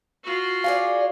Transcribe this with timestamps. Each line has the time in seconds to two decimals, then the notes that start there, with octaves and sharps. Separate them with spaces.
0.24 F4 F#4
0.64 G#4 C#5 D5 F5